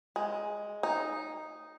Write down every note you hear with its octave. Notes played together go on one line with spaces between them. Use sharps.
G#3
D#4